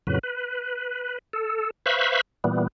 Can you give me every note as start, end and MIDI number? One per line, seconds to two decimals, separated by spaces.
0.07 0.19 41
0.07 0.19 45
0.07 0.19 49
0.07 0.19 54
0.07 0.19 71
0.23 1.18 71
1.33 1.70 69
1.86 2.21 71
1.86 2.21 72
1.86 2.21 76
1.86 2.21 77
1.86 2.21 83
1.86 2.21 85
2.44 2.67 46
2.44 2.67 52
2.44 2.67 55
2.44 2.67 59